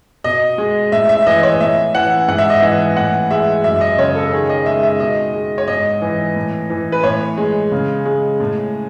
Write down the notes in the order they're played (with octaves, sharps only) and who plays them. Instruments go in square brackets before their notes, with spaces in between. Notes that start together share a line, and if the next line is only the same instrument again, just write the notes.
[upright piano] B2 D#5
G#3
A2 E5
E5
E3 D#5
C#5
A2 E5
E3 F#5
G#2 F#5
E5
D#5
E3 E5
A2 F#5
G#3 E5
F#2 E5
D#5
C#3 C#5
A4
D#3 G#4
D#5
G#3 E5
E5
B2 D#5
G#3
C#5
G#2 D#5
E3
A2
E3
B4
A2 C#5
G#3
C#3
G#3
A2